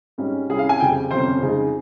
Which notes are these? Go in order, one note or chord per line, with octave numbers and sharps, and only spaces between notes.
G#2 G3 C#4
C2 C3 G3 C#4 G#4
F5
G#5
F1 F2 C#3 G3 G5
G1 F2 C3 G3 C#4 C5
F2 C#3 G#3 D#4